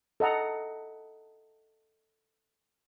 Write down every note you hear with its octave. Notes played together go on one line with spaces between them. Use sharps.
A4 D#5 F#5 A#5